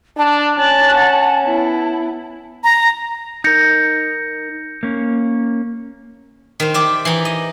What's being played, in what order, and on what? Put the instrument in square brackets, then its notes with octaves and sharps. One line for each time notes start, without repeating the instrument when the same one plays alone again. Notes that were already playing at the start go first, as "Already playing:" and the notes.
[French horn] D4 [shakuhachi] A5
[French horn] C#4 [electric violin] F#6 A6
[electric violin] F#5
B3 E4
[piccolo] A#5
[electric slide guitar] D#4 A#4 [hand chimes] G6 A#6 C#7
[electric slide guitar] A#3 C#4
[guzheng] D#3 C5
G4 D5 E5
E3 D#4
D#5